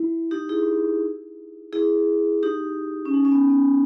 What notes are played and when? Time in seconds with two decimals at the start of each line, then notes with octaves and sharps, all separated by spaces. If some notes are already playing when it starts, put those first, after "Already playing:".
Already playing: E4
0.31 D#4 G4
0.49 E4 G#4
1.73 E4 G#4
2.43 D#4 G4
3.05 C#4
3.14 D#4
3.25 C#4
3.32 B3
3.50 B3